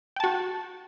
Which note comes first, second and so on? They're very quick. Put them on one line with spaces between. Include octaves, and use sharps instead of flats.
G5 A5 F#4